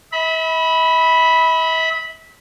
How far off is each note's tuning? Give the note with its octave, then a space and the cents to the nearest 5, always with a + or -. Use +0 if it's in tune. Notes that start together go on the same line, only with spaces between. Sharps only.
E5 -40 B5 -5